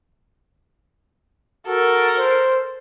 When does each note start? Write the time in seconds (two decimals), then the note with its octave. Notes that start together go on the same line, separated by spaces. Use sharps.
1.67 F#4 A4 A#4
2.18 C5